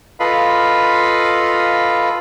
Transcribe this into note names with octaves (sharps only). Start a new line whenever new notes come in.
F4 A4 B4 D#5 F5 B5